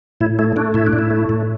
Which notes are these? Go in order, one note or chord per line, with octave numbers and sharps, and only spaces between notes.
A2 E4
A3 E4
A3 D4
A2 E4
D4
A2
E4
A3
A2